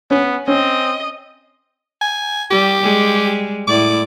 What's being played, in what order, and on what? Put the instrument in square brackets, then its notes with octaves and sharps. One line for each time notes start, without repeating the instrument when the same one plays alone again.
[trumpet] B3 [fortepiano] C#4
[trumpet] C4 [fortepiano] C#4 [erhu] D#5
[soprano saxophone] G#5
[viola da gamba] G3 [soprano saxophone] G4
[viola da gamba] G3 G#3
[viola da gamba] A2 E4 D5 [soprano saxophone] D6